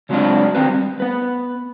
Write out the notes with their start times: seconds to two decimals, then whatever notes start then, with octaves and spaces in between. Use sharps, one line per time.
0.09 C#3 F#3 G#3 C4 D4 F4
0.55 D#3 C4 B4
0.69 G3
1.00 B3 B4